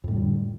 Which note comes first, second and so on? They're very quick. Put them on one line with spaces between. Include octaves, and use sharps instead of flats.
F2 A2 G3 D3